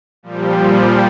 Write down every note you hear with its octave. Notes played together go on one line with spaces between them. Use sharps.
A#2 F3 G3